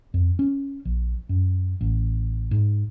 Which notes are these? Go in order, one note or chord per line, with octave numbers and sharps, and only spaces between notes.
F2
C#4
A#1
F#2
A1
G#2